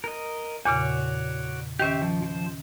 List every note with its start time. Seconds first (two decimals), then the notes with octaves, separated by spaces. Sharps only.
0.04 A#4 D#5
0.65 E2 A#2 C#3 F#4 C#5 D5
1.79 D#3 C#4 G4 C5 E5
2.02 F3
2.22 F3 C5